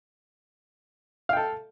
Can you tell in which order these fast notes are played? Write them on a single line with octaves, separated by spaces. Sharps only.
F5 G5 A4